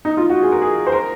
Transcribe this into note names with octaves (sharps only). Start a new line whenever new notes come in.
D#4
F4
F#4
G#4
A#4
G#4
C5
A#4